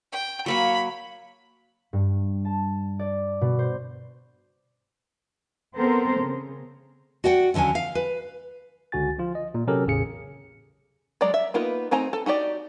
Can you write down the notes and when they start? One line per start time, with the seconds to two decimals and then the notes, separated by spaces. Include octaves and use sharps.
0.12 G5
0.46 F#3 A#3 C#5 B5
1.93 G2
2.45 A5
2.99 D5
3.41 B2
3.59 C5
5.76 B3 C4 A4 A#4 C5
6.20 C#3
7.24 F#4 D5 F#5 G5
7.54 D#2 D3 F#3 C#4 G#5
7.75 F5
7.95 B4
8.92 C#2 D3 F#4 G#5 A6
9.19 F3 F4
9.35 D#5
9.54 A#2
9.67 C3 F#3 C#4 G4 A4 A#4
9.86 A1 E2 A2 C#3 G#4 C#7
11.21 F#3 G#3 D5 A#5
11.34 E5
11.54 A#3 B3 D#4 F4 B4
11.91 A3 C4 D#4 G#5 A#5
12.13 A4
12.26 D#4 F#4 G4 D5